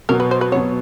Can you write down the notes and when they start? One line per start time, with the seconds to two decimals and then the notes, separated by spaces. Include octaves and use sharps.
0.09 B2 F#3 B3 A#4
0.20 B4
0.31 C5
0.41 B4
0.52 B2 F#3 B3 C#5